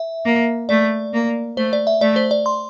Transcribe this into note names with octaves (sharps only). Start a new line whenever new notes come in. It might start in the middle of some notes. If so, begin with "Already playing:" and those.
Already playing: E5
A#3
A3 D5
A#3
A3 C5
D5
E5
A3 D5
C5
D5
C6